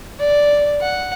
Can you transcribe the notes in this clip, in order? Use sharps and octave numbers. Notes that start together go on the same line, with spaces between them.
D5
F#5